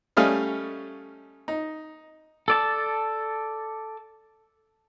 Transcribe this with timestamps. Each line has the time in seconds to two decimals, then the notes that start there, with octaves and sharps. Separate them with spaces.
0.17 G3 A3 C#4 D#5 F5
1.48 D#4
2.48 A4 D5 A5